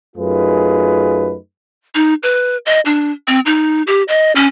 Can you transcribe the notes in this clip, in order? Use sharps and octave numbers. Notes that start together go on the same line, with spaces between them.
F#2 A3 D#4 F4 G#4 B4
D#4
B4
D#5
D4
C4
D#4
G4
D#5
C#4